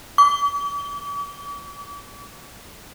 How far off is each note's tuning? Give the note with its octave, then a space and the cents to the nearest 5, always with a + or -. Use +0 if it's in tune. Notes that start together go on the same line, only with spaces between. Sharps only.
D6 -45